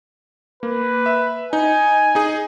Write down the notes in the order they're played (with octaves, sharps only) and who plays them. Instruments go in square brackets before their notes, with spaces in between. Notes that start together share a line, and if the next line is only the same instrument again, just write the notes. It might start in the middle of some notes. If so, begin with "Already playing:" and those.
[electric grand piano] A#3 [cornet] B4
[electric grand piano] E5
[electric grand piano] D#4 [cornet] G#5
[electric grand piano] D#4 G#4